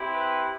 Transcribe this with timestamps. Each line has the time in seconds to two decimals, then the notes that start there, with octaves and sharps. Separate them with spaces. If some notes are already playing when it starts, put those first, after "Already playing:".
Already playing: C4 E4 G4
0.14 B4